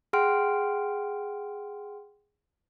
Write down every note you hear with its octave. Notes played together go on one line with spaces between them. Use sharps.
G#4 F#5 G5 C6 F6 D7